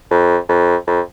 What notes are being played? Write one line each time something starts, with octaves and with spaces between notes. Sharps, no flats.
F2
F2
F2